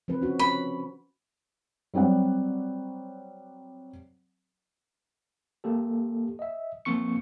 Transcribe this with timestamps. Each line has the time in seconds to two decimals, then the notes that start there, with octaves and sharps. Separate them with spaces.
0.08 F3 C4 B4
0.21 C#4 F#4
0.39 C#4 B5
1.94 F#3 G3 C4 D5 F#5
5.64 A#3 G4 A4
6.39 D#5 E5
6.85 F3 A#3 C4 C#6 C#7